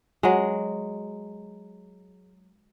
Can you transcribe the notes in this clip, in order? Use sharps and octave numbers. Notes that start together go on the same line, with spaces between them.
F#3 G#3